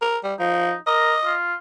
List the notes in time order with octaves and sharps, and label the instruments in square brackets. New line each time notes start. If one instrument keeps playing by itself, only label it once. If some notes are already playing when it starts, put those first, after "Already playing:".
[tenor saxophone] A#4
G3
[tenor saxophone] F3 [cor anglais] D#4
[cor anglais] A#4 [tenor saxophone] D#5
[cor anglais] F4